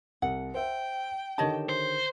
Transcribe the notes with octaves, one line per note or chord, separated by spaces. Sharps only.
C2 F#5
C5 E5 G5
D3 D#3 G4 C#5 D#5 A5
C5